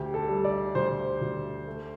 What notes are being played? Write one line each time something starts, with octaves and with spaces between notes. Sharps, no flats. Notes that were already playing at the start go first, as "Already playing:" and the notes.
Already playing: D2 G4
A4
G3
D5
D2 C5
D2
A3